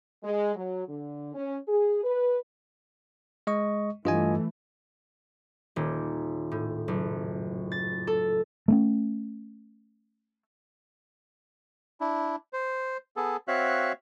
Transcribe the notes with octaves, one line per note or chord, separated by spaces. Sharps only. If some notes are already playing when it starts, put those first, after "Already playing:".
G#3
F#3
D3
C#4
G#4
B4
G#3 D#5 C#6
G2 E3 A3 F4 D#5 G#5
D#1
A2
F#1
A6
A4
A3 A#3 C#4
D4 E4
C5
B3 G#4 A4
C4 F#4 C#5 E5 F5 F#6